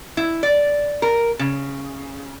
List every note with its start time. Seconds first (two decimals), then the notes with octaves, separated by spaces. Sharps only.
0.17 E4
0.43 D5
1.02 A#4
1.39 C#3